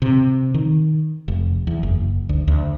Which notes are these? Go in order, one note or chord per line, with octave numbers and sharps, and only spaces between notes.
C3
D#3
F1
E2
F#1
D2
D2